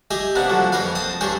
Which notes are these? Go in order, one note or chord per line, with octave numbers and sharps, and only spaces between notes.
G4 G#4 D#5 E5
C3 A#3 B3 D4
D3 F3 F#3
F2 A#3 A#4 B4 F5
C4 A5 D#6
G2 C#4 G#4 C5 G5